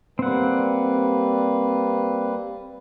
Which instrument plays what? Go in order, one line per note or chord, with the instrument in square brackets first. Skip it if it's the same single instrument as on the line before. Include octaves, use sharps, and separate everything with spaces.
[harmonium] G3 A#3 B4 [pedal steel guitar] C4 F#5